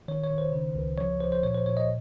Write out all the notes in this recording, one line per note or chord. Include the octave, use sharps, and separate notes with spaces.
D#3 C#5
C#5
D#3
C5
C#3
C#2
F3 C#5
F3 C5
C5
A#2 C#5
C5
A#2 C#5
D#5